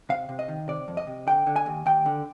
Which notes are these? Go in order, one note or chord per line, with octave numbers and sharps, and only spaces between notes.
C3 F5
C3
D#5
D#3
C3 D5
F2
D#5
C3
D3 G5
D3
G#5
D#2
D#2 G5
D3